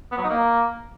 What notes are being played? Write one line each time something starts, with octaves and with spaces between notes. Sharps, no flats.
B3
F#3
D#4
A#3